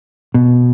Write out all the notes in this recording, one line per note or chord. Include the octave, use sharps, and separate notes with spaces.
B2